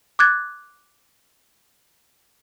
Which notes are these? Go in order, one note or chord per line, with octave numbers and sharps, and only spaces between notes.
D6 F#6 G#6 A6